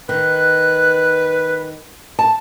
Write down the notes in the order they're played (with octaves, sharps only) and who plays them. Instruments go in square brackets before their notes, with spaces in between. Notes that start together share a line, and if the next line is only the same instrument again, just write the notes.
[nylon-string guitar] D#3 [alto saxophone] B4 [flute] F#6
[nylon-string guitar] A5